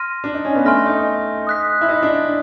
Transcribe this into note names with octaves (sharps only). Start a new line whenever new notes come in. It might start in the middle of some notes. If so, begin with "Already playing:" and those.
Already playing: C6 F6 A#6 D#7
D4
D#4
C#4
B3
A3 G#5 C6 F6 A#6
D#4
D#6 F#6 B6
E4
D#4
D4